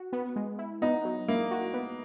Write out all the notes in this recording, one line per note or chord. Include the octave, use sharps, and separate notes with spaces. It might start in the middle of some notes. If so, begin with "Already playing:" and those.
Already playing: F#4
B3
G#3
E4
B3 D#4
F#3
A#3 E4
F#4
B3